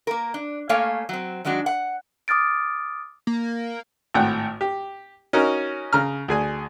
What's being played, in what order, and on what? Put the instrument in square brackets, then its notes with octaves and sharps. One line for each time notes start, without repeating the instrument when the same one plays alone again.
[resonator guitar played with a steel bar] A#3 A#4
D4
A3 A#3 C#5 F5 G#5
F#3 C4
D#3 F#3 G#3 D4 F#4
F#5
[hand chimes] D6 D#6 F6 A6 D7
[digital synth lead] A#3
[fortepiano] G#1 A2 F#5 G5
G4
C#4 D#4 F#4 A#4
C#3 A#5 F6
D2 G#4 G#5